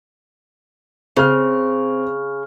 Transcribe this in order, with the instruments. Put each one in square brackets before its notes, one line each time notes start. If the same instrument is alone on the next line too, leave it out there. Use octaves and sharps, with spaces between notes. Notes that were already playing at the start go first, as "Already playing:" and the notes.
[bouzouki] C#3 [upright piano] C4 F6